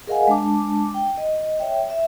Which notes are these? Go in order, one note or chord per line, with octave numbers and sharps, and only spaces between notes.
G#4 A#4 D#5 F5 F#5 G#5
G#3 D4 A5 D6
G5
D#5
C#5 E5 G5
E5